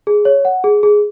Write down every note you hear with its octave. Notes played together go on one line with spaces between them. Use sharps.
G#4
C#5
F#5
G#4
G#4